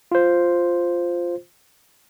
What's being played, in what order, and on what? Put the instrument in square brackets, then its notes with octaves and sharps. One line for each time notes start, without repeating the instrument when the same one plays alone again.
[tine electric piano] F4 C5